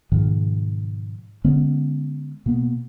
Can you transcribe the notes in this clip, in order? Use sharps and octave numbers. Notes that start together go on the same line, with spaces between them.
G#2 B2 D#3 F3
D3 G#3 B3 C#4
B2 A#3 B3